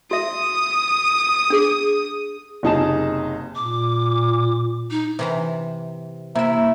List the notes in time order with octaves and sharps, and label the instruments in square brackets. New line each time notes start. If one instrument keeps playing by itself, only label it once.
[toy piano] F#4 E5 [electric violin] D#6
[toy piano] D4 G#4
[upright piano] F#1 C3 D#4 G#4 A5 E7
[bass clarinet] A#2 [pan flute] D6
[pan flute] D#4
[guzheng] C3 E3 A#5
[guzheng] C3 E5 [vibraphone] A#3 [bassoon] E4